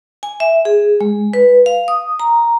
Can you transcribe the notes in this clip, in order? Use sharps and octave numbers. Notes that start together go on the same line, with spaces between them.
G#5
E5
G#4
G#3
B4
F5
D#6
A#5